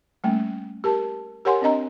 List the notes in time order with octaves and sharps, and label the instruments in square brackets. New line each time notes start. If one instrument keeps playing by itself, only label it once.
[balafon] G3 A3 A#3 C#4
G4 A#4 A5
G4 A#4 C#5 F#5 G#5 C6
C4 D4 D#5 A#5